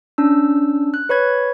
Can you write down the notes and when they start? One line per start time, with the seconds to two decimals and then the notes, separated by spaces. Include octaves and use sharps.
0.18 C#4 D4 E6
0.94 F#6
1.09 B4 C#5 B5 G#6